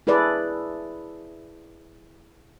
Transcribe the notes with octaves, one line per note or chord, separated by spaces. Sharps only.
E4 G#4 A4 B4 D5